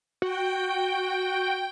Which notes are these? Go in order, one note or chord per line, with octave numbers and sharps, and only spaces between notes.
F#4 G5